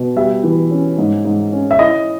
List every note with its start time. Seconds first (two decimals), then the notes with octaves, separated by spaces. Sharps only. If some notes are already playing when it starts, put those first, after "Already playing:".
Already playing: B2
0.16 G3 E5
0.44 E3
0.71 C#4
0.98 G#2
1.25 G#2
1.52 C#4
1.71 E5
1.79 E4 D#5